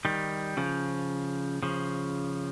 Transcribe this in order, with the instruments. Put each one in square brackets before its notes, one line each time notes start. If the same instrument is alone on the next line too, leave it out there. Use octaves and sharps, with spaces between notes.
[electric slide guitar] D#3 G3
C#3 F3
C#3 F3